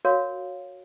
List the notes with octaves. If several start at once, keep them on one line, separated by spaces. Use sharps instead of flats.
F#4 A#4 C#5 F5